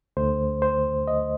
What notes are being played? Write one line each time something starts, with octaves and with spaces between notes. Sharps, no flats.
D2 D3 A3 C5
C5
D#5